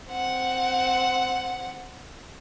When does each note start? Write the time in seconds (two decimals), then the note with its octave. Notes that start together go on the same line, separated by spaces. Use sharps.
0.11 C4 F#5